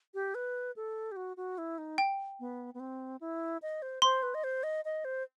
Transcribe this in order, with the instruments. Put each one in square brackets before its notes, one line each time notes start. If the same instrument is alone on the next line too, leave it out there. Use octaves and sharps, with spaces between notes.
[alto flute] G4
B4
A4
G4
F#4
F#4
E4
D#4
[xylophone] G5
[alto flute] B3
B3
C4
E4
D#5
C5
[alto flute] C5 [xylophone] C6
[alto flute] B4
D#5
C5
D#5
D#5
C5